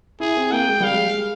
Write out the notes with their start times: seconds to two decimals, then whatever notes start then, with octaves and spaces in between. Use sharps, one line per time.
0.20 E4 G#4
0.37 C4
0.52 A#3 G5
0.68 G#3
0.80 G3 F5
0.93 G#3